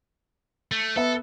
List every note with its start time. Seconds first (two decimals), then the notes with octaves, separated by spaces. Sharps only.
0.72 A3
0.96 B3 A4 E5